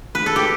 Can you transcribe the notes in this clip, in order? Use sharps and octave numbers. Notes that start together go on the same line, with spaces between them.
B4
A4
G4